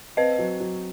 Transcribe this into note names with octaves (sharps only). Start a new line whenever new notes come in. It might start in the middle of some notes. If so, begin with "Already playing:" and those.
C4 B4 D#5
F#3
F#3